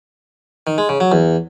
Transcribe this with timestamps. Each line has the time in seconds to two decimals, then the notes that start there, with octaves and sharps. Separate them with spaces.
0.67 D#3
0.78 G#3
0.89 C#3
1.00 F#3
1.12 E2